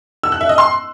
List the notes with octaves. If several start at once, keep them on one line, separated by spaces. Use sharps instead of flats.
E6
F#6
E5
D#5
C6